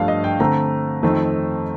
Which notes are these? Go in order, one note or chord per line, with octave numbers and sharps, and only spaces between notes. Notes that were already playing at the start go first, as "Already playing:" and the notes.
Already playing: G2 F3 A3 D4 F5
D#5
G5
D3 A3 C4 A#5
F2 D#3 A3 C4 D#4